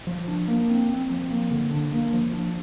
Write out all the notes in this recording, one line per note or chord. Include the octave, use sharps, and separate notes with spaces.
F3
D4
A#3
C4
C4
F3
A#3
D3
D4
A#3
F3
D4